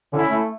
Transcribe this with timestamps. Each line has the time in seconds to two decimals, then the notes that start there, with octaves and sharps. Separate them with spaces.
0.13 D3 C#4 E4
0.29 A3